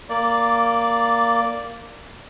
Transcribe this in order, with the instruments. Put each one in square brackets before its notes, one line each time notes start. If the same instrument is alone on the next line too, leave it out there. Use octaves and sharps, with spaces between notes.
[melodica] A#3 D5